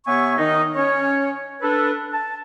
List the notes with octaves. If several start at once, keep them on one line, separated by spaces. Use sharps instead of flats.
C3 B3 C#5 E5 G#5 C#6
D#3 D#4
C#4 C#5
D4 A4 B4
A5